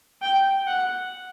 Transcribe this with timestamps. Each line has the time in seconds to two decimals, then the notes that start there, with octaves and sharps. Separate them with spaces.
0.22 G5
0.67 F#5